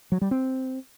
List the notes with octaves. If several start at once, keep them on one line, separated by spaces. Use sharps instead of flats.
F#3
G3
C4